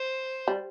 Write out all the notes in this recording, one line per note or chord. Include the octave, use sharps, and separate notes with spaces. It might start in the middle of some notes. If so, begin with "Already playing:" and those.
Already playing: C5
G3